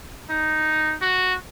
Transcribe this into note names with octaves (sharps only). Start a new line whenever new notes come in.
D#4
F#4